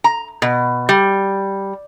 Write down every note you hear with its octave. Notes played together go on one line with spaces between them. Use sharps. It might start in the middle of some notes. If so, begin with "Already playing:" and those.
A#5
B2
G3